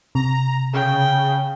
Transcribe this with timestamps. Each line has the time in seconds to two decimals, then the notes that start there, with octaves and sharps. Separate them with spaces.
0.15 C3 A#5
0.73 C#3 G5